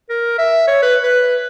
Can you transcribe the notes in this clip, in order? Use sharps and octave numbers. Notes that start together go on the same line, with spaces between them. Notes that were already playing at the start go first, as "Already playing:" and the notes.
A#4
E5
C#5
B4
B4